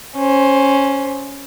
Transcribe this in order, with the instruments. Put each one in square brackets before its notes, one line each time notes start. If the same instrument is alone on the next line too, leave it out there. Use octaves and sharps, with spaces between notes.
[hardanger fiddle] C#4 C5